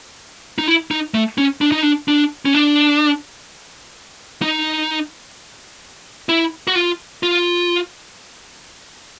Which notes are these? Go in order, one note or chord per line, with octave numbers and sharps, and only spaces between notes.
D#4
E4
D#4
A3
C#4
D4
D#4
D4
D4
C#4
D4
D#4
E4
F#4
F4
F4